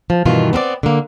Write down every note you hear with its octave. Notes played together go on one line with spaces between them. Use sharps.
F3
G2 B2 D#3 E3 F4
B3 C4 A#4 D5
D3 A#3